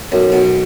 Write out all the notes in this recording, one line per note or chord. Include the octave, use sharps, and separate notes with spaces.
B1 F#2
B2